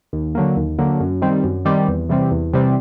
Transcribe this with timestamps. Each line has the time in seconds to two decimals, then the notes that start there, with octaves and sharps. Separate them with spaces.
0.13 D#2
0.35 D3 F#3 A#3
0.56 D#2
0.79 D3 F#3 A#3
1.00 F#2
1.22 D#3 G3 C4
1.44 F#2
1.65 D#3 G3 C4
1.88 E2
2.09 C3 E3 G3 C4
2.31 E2
2.53 C3 E3 G3 C4